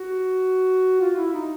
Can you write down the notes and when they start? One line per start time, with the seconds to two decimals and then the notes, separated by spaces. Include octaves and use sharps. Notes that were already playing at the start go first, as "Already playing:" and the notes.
Already playing: F#4
1.00 F4
1.17 E4
1.33 D#4